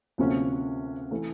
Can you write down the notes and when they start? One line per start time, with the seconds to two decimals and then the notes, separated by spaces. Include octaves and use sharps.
0.18 D2 C3 F3 A#3 C#4
1.11 E3 A3